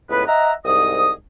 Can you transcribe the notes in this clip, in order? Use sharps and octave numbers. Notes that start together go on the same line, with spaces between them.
C#2 A2 B3 B4
D#5 E5 F#5 A#5
C2 G#2 D#5 D#6